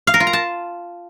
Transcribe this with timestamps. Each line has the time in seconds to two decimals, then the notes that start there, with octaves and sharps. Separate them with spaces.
0.07 F5
0.14 A#4
0.20 F4
0.27 A#5
0.33 A5